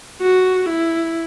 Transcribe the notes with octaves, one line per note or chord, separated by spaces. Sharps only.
F#4
E4